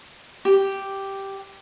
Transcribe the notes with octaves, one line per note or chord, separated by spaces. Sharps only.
G4